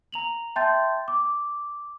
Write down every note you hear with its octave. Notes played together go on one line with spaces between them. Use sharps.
A#5 F7 F#7
E5 G5 A5 C6 G6 A6
D6